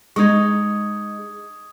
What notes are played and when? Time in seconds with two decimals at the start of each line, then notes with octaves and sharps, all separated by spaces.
0.16 G#3 D#4 C#6 D#6 G#6